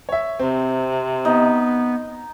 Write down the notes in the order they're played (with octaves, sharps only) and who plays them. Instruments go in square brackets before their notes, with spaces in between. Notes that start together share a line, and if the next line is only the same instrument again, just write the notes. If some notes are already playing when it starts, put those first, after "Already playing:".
[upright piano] C#5 E5
[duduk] C3 [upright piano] C4
[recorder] B3 [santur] D#4